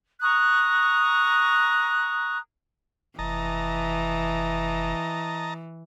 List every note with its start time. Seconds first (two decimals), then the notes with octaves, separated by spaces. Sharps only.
0.21 A#5 C#6 D#6 F#6
3.19 F1 E3 D#5 A5 A#5